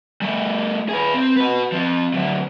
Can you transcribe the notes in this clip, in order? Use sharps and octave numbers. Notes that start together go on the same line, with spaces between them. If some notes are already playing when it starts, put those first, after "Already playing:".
G3 A3
G#4 B4
C4
F#4 B4
F3 C4
D3 F#3